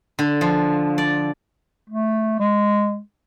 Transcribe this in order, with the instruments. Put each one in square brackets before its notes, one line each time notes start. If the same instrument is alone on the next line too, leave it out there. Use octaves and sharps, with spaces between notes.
[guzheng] D3
F3
D5
[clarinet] A3
G#3